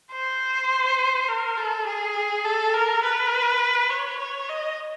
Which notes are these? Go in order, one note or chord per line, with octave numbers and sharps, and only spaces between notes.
C5
A#4
A4
G#4
A4
A#4
B4
C#5
C#5
D#5